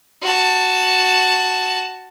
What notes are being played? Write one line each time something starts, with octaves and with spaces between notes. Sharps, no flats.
F#4 A5